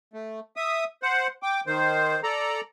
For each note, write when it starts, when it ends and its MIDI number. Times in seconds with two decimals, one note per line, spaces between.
0.13 0.40 57
0.56 0.84 76
0.56 0.84 87
1.03 1.27 72
1.03 1.27 78
1.43 1.61 79
1.43 1.61 86
1.67 2.20 51
1.67 2.20 72
2.23 2.61 69
2.23 2.61 74
2.23 2.61 82